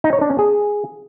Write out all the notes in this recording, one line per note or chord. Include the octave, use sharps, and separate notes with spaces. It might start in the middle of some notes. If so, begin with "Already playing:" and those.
D#4
C#5
D4
C#4
G#4